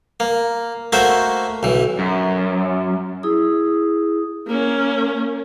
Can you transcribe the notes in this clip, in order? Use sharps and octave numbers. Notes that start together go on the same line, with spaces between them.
A#3
A3 A#3 F#4 C5 E5
B1 E3
F#2
E4 G#4 D#6
A#3 C#4